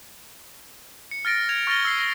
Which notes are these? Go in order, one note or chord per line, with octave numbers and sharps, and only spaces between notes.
C#7
F6 A6 A#6 D7
G#6 F7
C#6 F6 A6 A#6 D7 G7
E6 C7
A#6